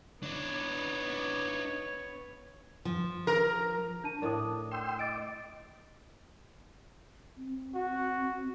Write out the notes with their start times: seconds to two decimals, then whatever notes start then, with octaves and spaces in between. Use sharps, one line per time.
0.23 B3 D4 D#4 C#5
2.85 F3
3.27 A#4
4.04 D4 A5 D#7
4.22 A2 D4 A#4 D#6
4.71 G5 C6 E6
4.99 D#5 D6 A6 D7
7.37 C4
7.75 F#4